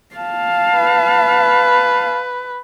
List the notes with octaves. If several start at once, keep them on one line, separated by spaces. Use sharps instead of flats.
F5 A5
B4